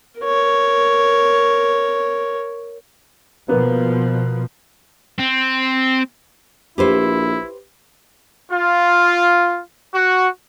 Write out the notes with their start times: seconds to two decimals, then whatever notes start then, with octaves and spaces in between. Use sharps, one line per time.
0.21 A#4 C#5
3.48 B2 F3 A#3 B3
5.19 C4
6.78 A#1 E4 G4 B4 C5
8.52 F4
9.93 F#4